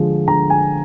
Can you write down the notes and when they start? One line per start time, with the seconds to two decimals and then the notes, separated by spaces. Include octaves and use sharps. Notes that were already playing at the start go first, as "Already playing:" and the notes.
Already playing: D3 F3 G#3
0.28 D3 A#5
0.50 G#5